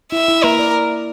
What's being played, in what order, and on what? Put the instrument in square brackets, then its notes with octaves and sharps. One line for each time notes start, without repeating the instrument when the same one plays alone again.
[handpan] E4 [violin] E5
[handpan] E4
[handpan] A#3 [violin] A#4
[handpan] D5